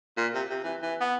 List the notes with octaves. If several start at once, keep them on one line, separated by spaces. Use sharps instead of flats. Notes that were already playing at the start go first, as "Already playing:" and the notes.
A#2
C3
C3
E3
E3
B3